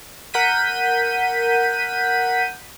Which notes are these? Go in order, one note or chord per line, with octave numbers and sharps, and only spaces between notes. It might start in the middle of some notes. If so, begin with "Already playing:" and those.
A#4 F#5 G6 B6 D#7